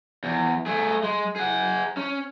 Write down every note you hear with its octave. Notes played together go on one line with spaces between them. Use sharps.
E2
A3 G#4
G#3
G#4 F#5
C#4